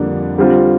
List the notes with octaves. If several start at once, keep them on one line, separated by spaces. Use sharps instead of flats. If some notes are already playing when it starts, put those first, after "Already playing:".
Already playing: F2 D3 G3 A#3 D4
D3 G3 C4 F4